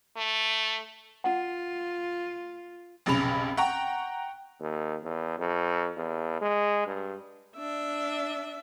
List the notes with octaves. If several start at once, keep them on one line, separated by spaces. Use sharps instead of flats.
A3
F4 F#5
F1 B1 C#3 B5 F7
F#5 G5 A#5 C#6
D#2
E2
F2
E2
G#3
G2
D4 E5